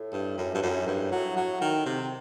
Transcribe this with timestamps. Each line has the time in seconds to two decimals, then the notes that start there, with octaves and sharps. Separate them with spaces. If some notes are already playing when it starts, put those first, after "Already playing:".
Already playing: A2
0.13 G2
0.38 F#2
0.55 G2
0.62 F#2
0.87 G2
1.12 F#3
1.37 F#3
1.61 D#3
1.86 C3